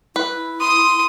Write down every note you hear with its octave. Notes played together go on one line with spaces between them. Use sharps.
E4 B4
C6 D#6